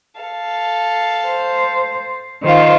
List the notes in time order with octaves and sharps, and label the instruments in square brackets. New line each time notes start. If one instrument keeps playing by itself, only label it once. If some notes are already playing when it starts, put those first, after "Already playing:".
[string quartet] A4 F5
[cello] C5
[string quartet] D#3 F4 [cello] C5 F5